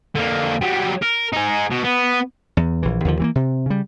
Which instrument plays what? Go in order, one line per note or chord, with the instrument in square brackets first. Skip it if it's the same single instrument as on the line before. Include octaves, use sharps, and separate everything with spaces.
[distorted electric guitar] D3 A#3
F#3 G3
A#4
D#4 G#4
B2
B3
[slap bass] E2
A#1 E3
D#2 D3 F3
E3 A3 A#3
C3
C#3 G3